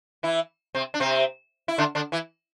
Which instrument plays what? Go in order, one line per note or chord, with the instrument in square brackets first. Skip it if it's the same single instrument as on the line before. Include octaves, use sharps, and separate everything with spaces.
[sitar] E3 E4
C3 C4
D4
C3 C4
E4
D3 D4
D3 D4
E3 E4